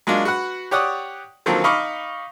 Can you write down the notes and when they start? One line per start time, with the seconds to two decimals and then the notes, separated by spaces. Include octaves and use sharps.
0.07 F#3 G#3 A#3 D4 F4
0.25 F#4 B4 F#5
0.71 G4 C#5 D5 F#5 D#6
1.46 D3 D#3 F3 F#3 A#3 C4
1.64 D#4 D#5 F5 B5 C#6 D6